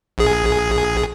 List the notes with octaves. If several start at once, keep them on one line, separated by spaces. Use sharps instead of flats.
A#1 G#4